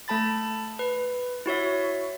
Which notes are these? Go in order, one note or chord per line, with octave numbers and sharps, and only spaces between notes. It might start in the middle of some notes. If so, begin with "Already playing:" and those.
A3 A4 A5 B5 A6
B4
E4 F#4 C#5 E5